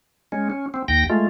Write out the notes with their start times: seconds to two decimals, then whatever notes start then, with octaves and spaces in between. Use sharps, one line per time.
0.32 G#3 C#4
0.50 C#4
0.74 C4
0.88 D#2 G5 A#6
1.10 G#3 A3 F4